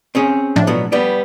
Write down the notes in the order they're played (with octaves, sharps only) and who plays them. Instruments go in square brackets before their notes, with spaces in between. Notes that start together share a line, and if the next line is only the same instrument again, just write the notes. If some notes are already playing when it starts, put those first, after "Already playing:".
[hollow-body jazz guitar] C4 C#4 G#4
[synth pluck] A2 F3 D4
[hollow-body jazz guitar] B2 F#3 B3
G3 B3 D5